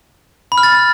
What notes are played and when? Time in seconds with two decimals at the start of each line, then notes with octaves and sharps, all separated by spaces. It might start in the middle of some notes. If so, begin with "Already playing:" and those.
0.52 B5
0.58 F6
0.63 A6